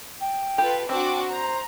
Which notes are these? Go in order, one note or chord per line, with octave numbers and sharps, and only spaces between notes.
G5
F4 G4 A4 B4
C4 D4 F#4 G5 D6
C5 A#5